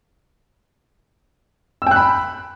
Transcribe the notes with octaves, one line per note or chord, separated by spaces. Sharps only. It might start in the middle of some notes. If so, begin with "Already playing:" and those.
G5 B5 E6 F#6